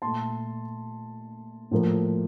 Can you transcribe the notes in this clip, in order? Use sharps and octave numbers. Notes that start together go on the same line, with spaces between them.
A#2 A3 A5 C6
A2 F3 A#3